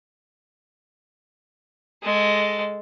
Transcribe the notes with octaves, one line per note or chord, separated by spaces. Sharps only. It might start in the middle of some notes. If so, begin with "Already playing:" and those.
G#3 A4